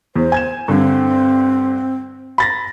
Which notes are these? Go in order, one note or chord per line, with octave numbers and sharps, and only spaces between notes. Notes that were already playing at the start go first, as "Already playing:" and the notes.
E2 C5
G#5 G#6 E7
G2 D3 C4
B5 A6 A#6